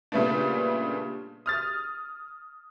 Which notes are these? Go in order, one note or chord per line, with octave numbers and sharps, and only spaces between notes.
A#2 C#3 G3 A3 B3 D4
D#6 F6 A6